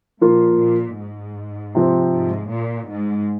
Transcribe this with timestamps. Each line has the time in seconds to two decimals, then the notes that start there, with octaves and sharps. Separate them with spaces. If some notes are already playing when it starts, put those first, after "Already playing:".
0.21 A#2 F3 A#3 F4
0.59 A#2
0.99 G#2
1.75 C3 F3 C4
2.13 G#2
2.51 A#2
2.90 G#2